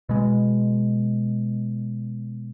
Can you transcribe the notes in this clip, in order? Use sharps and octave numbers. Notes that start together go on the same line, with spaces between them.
B2 G#3